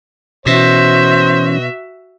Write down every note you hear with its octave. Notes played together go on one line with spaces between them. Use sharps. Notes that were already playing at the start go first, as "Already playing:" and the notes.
B2 E3 C#4 F#4 C5 E5